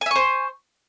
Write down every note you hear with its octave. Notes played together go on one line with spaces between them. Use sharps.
C5 E5 G#5 C#6